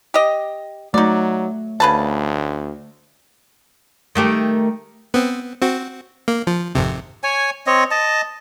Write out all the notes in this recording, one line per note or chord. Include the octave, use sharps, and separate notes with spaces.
G4 D#5
F#3 A3 D#4 D5
D2 C#3 B4 A5
D#3 A3 G4
B3 C4
C4 F#4
A#3
F3
G#1 F2 C3
C#5 G#5
C4 C#5 D#5
D#5 A5